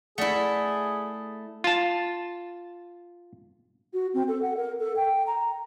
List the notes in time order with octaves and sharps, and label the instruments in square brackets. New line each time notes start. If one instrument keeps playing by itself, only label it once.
[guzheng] A3 E4 [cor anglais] G#4 [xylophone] D5 F#5
[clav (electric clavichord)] F4 A5
[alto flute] F#4
C4
A4
F#5
A#4
A4
G5
A#5